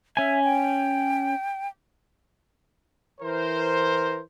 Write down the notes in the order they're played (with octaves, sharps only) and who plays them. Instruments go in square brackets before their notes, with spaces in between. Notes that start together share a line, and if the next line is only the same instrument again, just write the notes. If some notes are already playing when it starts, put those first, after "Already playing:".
[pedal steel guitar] C#4 G#5 [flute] E5
[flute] G5
[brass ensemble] E3 A#4 C5